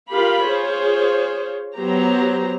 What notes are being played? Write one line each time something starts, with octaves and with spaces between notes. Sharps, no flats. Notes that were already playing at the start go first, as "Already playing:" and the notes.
F4 G4 A#4 F5 B5
F4 G#4 C5 C#5
F#3 B3 G4 C5 A#5